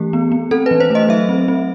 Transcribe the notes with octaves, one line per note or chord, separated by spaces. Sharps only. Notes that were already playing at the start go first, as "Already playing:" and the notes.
Already playing: E3 A3 G4
B3
B3
C4 A4
E3 B4
C5
A3 D#5
F#3 E5
C4
C4